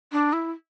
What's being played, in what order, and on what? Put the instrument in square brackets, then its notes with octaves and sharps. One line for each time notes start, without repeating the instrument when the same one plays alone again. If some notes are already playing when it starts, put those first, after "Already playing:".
[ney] D4
E4